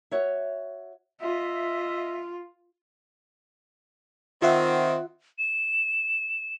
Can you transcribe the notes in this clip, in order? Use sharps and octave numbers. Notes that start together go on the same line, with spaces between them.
F#4 C#5 E5
F4 D#5 E5
D#3 C4 F4 E5 F#5
E7